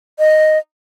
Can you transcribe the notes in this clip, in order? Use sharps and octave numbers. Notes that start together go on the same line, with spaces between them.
D#5